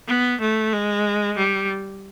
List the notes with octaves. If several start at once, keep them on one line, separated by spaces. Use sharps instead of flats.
B3
A3
G#3
G3